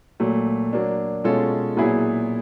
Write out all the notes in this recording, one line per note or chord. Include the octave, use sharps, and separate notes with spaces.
A#2 F#3 A3
F#3 A#3 D4
B2 G#3 C#4 F4 A4
A#2 F#3 B3 E4 G#4